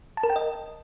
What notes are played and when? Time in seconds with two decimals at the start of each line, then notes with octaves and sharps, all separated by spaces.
0.17 A5
0.23 A#4
0.30 G5
0.36 D#5